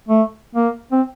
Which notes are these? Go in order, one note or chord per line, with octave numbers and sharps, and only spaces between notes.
A3
A#3
C4